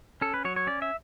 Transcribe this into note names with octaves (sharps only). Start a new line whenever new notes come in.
C#4 A4
B4
F#3 C#5
C#5
C#4 D5
E5